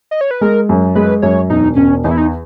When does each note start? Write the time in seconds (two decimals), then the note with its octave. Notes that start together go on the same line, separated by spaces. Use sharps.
0.11 D#5
0.21 C#5
0.31 B4
0.41 G#3 A#4
0.69 F#2
0.95 G#3 B4
1.22 F#2 C#5
1.50 E1 D#4
1.76 E1 C#4
2.04 E2 D#4
2.11 E4
2.18 D#4